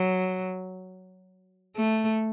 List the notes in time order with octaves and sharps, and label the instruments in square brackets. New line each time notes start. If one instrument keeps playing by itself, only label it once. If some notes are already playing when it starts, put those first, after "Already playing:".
Already playing: [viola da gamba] F#3
A3